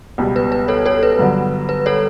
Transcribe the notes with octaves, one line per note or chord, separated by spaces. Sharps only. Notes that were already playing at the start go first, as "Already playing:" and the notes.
C#2 B2 G3
B4
B4
A4 C#5
A4 C#5
B4
G2 D3 F#3 B3
B4
A4 C#5